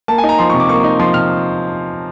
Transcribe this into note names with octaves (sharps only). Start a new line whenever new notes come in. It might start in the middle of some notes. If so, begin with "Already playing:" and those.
A#3 A5
G#5
D#4
A#5
F3 C6
C3 C#6
D6
A#3 C#6
D#4
F3 C6
C3 F6